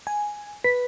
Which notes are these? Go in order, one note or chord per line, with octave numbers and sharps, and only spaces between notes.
G#5
B4 B6